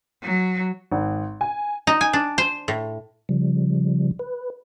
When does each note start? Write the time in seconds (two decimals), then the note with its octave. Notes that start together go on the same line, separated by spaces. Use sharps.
0.22 F#3
0.92 G#1
1.41 G#5
1.87 D#4
2.01 G#5
2.13 D4
2.38 C5
2.68 A2
3.29 C#3 F3 G3
4.19 B4